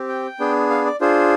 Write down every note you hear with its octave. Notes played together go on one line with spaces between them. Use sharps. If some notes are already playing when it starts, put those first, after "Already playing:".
Already playing: C4 G4
G5
B3 D4 G#4
F5
D5
D4 F4 G#4 C5